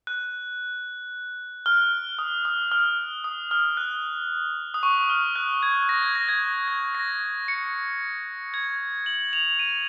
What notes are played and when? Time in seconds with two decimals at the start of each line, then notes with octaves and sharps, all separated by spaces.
0.07 F#6
1.66 F6
2.19 D#6
2.45 D#6
2.72 F6
3.24 D#6
3.51 F6
3.77 F#6
4.74 D#6
4.83 C#6
5.10 F6
5.36 F#6
5.63 G#6
5.89 A#6
6.02 G#6
6.15 A#6
6.29 G#6
6.68 G#6
6.95 A#6
7.48 C#7
8.54 G#6
9.06 F#7
9.33 F7
9.59 D#7